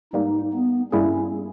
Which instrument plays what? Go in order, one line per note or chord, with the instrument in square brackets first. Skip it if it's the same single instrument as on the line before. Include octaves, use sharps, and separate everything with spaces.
[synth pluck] G#2 G3 A#3 [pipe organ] D#4
[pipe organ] B3
[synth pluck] G2 G3 A#3 E4 G#4 [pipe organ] C#4